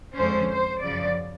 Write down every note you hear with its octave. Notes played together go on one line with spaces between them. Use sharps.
F2 D3 F3 G#3 C#4 C5
C5
F#2 C#3 F3 D5